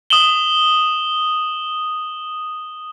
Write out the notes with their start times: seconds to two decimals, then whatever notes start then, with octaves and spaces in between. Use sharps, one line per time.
0.10 D#6 E7 F#7 G7